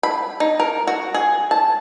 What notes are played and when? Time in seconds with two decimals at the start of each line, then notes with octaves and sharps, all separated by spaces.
0.03 B5
0.40 D#4
0.60 A#4
0.87 F#4
1.14 G#4
1.51 A5